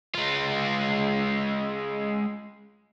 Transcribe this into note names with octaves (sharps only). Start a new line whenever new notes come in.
G#3 F4